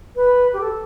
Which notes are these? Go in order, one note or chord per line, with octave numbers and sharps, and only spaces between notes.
B4
G4
A4